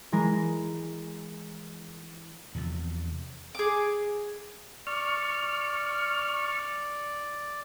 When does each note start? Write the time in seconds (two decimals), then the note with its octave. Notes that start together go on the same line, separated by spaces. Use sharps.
0.12 E3 G#3 A#4
2.55 E2 C3 F3
3.55 G#4 D6
4.87 D5 C#6 F6